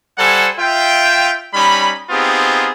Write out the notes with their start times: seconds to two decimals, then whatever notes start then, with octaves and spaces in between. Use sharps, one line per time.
0.18 G3 A4 C5 F#5 G#5
0.58 F4 E5 G5
1.54 G3 C#4 D#4 B5
2.10 B3 C4 D#4 F4 G4 G#4